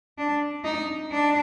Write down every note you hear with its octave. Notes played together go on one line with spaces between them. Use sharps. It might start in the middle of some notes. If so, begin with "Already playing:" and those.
D4
D#4
D4